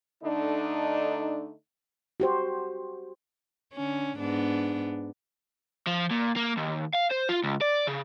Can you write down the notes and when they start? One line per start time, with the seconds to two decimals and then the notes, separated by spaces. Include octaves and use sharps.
0.23 D3 A3 D4 D#4
2.20 F#4 G4 C5
3.73 D3 C#4
4.18 G#2 B3 D4
5.87 F3
6.11 A#2
6.36 A#3
6.57 D#2
6.94 F5
7.11 C5
7.29 F4
7.44 C#2
7.61 D5
7.87 C#3